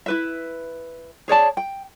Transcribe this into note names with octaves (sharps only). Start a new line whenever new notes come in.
E4 B4 E5
G#4 C#5 D5 A5
G5